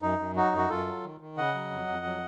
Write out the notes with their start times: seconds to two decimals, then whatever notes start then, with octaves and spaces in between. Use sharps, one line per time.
0.02 F#2 D#4
0.19 F#2
0.36 F#3 D#4 F#4
0.52 F#2 F#4
0.69 F#2 F4 A4
0.86 F#3
1.04 D#3
1.21 D#3
1.37 C#3 D#5 F#5
1.55 F#3
1.71 F2
1.88 F2
2.05 F#3